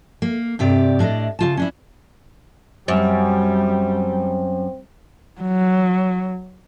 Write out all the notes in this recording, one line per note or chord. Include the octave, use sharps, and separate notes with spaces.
A#3
G2 C3 G4 D5
A2 D4 D5 D#5
C#3 F4 A5
C#4 D4 E4
F#2 G3 C4
F#3